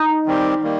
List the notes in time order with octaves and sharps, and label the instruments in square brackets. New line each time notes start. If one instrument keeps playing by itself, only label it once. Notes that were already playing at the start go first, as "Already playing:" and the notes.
Already playing: [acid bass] D#4
[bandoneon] D#3 G3 C4 G4
D#3 G3 A#3